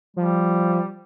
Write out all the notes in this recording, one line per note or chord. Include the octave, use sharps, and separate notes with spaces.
F3 G3